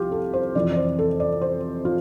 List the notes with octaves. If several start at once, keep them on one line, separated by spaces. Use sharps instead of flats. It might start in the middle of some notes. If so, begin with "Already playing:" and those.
Already playing: C2 C3 F3 F4 G4
A4
C5
F2 C3 E3 D5
D5
C5
A4
D5
C5
F4